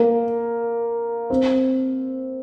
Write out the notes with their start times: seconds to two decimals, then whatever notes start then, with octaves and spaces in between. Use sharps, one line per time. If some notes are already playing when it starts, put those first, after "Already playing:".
Already playing: A#3
1.30 C4